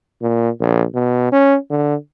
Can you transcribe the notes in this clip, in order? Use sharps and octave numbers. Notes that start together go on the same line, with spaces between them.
A#2
A#1
B2
C#4
D3